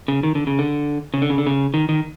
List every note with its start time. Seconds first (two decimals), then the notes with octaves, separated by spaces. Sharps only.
0.08 C#3
0.23 D#3
0.35 D3
0.47 C#3
0.59 D3
1.14 C#3
1.22 D3
1.30 C#3
1.38 D3
1.47 C#3
1.74 D#3
1.89 D#3